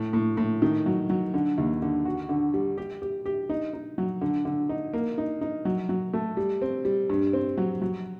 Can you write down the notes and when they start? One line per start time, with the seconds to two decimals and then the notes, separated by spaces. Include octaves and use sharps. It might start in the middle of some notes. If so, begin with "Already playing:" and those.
Already playing: A2
0.13 A2
0.37 A2
0.62 D#3
0.86 F#3
1.10 F#3
1.34 D3
1.58 D#2
1.82 D3
2.05 F#4
2.29 D3
2.54 G3
2.78 G4
3.02 G4
3.26 G4
3.49 D#4
3.73 D#4
3.98 F#3
4.21 D3
4.45 D3
4.69 D#4
4.93 A#3
5.18 D#4
5.41 D#4
5.65 F#3
5.89 F#3
6.13 A3
6.37 G3
6.62 C4
6.85 G3
7.10 G2
7.33 C4
7.58 F#3
7.82 F#3